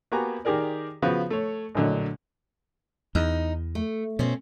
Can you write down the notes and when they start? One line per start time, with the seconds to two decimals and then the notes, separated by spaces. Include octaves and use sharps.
0.12 A#3 B3 F#4 G4 G#5 A#5
0.45 D#3 G4 G#4 A#4 D5
1.02 C#3 F3 B3 F#4
1.30 A3 C#5
1.75 A#1 A2 D3 F#3 D#5
3.15 E2 D#4
3.75 A3
4.19 B2 C4 C#4